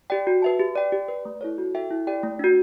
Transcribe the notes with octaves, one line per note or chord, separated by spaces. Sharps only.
G4 D5 G5
F#4
B4 E5 A5
G4
D5 G5
G4
B4 D5
A3
E4 A4 C#5
F#4
A4 E5 G5
E4
G4 D5 G5
A3
D4 F#4